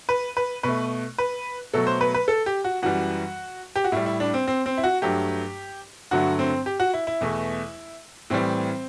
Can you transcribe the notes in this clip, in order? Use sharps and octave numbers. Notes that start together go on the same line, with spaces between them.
B4
B4
B2 A3 B4
B4
B2 F#3 A3 A4
C5
B4
B4
A4
G4
F#4
F#2 E3 G3 F#4
G4
F#4
A2 G3 E4
E4
D4
C4
C4
C4
E4
F#4
G2 F#3 A3 G4
G2 D3 F#3 A3 F#4
C4
G4
F#4
E4
E4
E2 B2 A3
A2 E3 G3 C4